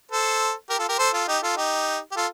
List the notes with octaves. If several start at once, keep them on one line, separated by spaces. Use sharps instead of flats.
A4 C5
G4 A#4
F4 A4
G4 A#4
A4 C5
F4 A4
D#4 G4
F4 A4
D#4 G4
G4
F4 A4